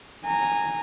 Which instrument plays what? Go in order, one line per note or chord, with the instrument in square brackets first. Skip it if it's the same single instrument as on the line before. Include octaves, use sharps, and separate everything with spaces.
[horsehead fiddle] G#5 A#5